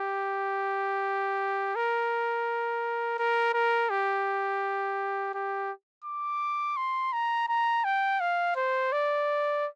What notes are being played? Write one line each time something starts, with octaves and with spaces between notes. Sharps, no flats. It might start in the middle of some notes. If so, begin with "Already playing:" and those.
Already playing: G4
A#4
A#4
A#4
G4
G4
D6
C6
A#5
A#5
G5
F5
C5
D5